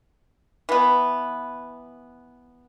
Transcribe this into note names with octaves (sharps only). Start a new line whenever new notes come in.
E3 B3